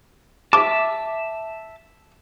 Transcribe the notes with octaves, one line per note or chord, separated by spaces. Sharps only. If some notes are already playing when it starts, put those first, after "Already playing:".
E5 A5 D6